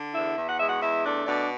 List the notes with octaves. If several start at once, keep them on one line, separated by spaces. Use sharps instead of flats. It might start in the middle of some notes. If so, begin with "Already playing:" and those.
Already playing: D3
E2 E4 E5
E2
F#5
G#3 E5
F#4 F#5
E2 E4 E5
A3 D4 D5
B2 D4 D5